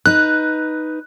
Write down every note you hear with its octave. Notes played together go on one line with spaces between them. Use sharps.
D#4 B4 F#6